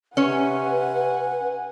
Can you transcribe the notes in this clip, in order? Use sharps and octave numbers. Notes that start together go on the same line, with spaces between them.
C3 C#4 B4 C#5 F#5 G#5